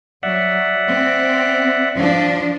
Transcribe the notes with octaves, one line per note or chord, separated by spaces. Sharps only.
F#3 D5 E5 F#5
C4
F3 D4